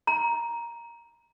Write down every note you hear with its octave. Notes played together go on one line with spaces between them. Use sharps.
A#5